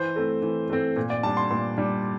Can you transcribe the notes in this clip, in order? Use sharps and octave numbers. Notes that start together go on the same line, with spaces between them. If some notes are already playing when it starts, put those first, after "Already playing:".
Already playing: E3 C5
A3 C4
E3
A3 C4
A#2
D5
G3 D4 A5
C6
A#2 C6
G3 D4